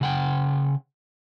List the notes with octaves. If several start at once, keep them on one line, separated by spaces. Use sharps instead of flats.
C#3 F#5 G5